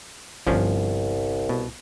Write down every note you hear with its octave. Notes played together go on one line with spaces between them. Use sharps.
G1 C2 F3 B3 C#4 D4
B2